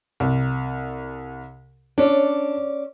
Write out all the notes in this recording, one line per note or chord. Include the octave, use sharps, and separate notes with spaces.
C2
C#4 D4 D5